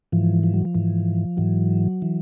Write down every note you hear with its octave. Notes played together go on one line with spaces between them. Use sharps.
G#2 E3 F3
F3
F#3
F3
G#2 E3
G#2 E3 F#3
E3